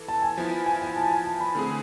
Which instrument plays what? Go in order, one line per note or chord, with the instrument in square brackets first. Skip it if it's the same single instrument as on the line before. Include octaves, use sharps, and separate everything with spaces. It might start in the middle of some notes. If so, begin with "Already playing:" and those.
Already playing: [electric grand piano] E3 A4
[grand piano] A5
G#5
[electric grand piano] F3 B3 E4
[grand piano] G#5
G#5
A5
G#5
A5
B5
[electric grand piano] D3 A3 C4 G#4